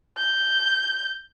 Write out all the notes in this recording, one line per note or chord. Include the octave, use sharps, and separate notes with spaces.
G6